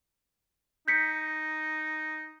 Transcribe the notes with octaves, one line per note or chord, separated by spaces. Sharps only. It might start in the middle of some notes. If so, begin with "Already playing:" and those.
D#4 G6 B6 C#7